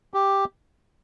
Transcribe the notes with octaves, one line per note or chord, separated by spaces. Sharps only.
G4